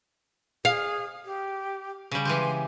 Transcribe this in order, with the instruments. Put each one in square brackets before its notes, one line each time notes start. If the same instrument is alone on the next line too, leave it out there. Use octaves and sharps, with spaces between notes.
[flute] G#4 [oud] F5
[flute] G4
[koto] C#3 G3
[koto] E3 G#3 G4 [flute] C6